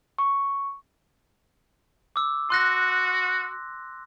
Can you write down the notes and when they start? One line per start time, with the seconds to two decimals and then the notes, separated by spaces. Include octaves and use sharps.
0.18 C#6
2.16 D6 E6
2.50 F#4 C6 F#6 A#6